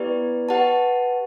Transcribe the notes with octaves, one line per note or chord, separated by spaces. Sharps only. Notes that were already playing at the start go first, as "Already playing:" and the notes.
Already playing: B3 E4 G4 B4 D5
G4 B4 F#5 A5